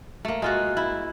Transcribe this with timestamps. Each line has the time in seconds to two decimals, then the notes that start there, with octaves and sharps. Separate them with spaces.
0.25 A3 A#3
0.42 G#3 F4 F#4
0.77 E4